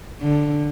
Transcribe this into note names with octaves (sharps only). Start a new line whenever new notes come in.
D3